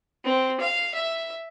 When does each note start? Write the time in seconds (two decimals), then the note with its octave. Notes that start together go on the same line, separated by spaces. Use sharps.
0.25 C4
0.60 F5
0.94 E5